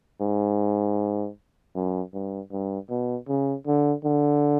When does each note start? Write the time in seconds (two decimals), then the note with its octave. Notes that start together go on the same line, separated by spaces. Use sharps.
0.21 G#2
1.75 F#2
2.13 G2
2.52 G2
2.90 B2
3.28 C#3
3.67 D3
4.05 D3